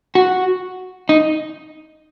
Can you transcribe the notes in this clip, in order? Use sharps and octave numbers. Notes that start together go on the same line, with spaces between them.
F#4
D#4